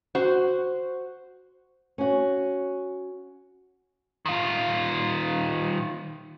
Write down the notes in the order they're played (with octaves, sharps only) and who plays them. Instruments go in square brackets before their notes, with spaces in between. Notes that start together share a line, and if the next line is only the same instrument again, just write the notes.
[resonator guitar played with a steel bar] F#4 C5
[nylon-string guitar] C#4 F#4
[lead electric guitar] D#3 F4